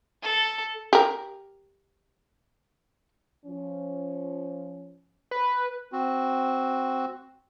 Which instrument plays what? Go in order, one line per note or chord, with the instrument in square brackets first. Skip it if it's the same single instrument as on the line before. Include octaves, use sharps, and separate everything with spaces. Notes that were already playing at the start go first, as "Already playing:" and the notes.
[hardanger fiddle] A4
[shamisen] G4 A#4
[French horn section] F3 C#4
[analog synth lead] B4
[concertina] C4 F#4